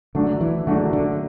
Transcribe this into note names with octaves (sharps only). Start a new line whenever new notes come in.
D3 F#3 A3 D4 F#4
E3
D3 F#3 A3 D4 F#4
D3